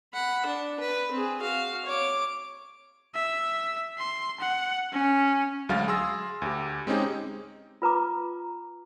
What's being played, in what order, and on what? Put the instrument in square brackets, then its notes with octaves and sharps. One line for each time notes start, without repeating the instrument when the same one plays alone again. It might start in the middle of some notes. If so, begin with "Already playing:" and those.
[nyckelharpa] F#5 B5
D4
B4
C4 G#4
F#4 F5
C#5 D6
[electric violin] E5
C6
F#5
C#4
[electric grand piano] D2 F#3 G#3 F5 F6 A6
G#4 C6 E6 A#6
D2 G4
G#3 C4 C#4 D#4 G4 G#4
[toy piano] F4 B4 A#5 D6